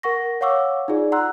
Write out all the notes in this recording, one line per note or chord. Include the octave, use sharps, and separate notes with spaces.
A#4 F#5 C#6 A#6
C#5 F5 F#5 C#6 D6 E6
D#4 F4 G#4 D5
F#5 A#5 C6 E6 F#6